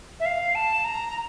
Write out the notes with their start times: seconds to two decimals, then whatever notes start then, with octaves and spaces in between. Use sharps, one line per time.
0.20 E5
0.26 F5
0.55 A5
0.85 A#5